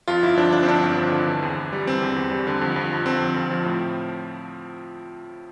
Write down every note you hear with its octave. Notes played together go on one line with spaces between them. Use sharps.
F2 F4
G1 E4
F3 D4
D3 D4
C4
F2 D4
G1
F3
D3
E3
E2
E2
G3
E3 C4
E2
E2
G3
D3
F2
F2
F3
D3 C4
F2
F2
F3
A2